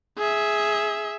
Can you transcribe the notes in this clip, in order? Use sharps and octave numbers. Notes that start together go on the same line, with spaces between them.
G#4 E5